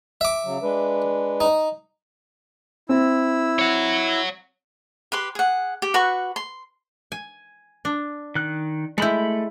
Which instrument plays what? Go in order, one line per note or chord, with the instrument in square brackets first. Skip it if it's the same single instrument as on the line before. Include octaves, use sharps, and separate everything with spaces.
[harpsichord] E5 D6
[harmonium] C#3 F#3
G#3 D4 B4
[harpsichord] D#4
[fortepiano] C4 [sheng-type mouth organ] E4 E6
[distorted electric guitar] C#5 F#5
[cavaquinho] G4 B4 C6
G#4 F#5
G4
F#4 B4 B5 C#6
C6
[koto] G#5
D4
[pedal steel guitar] D#3 F#6
[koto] G#3 E4 [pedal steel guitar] A3 B5 G6